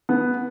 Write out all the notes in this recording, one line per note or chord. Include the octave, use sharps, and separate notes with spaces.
B3